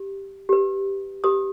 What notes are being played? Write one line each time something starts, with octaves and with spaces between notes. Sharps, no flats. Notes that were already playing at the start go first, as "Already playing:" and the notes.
Already playing: G4
G4 B4
G4 B4 D#6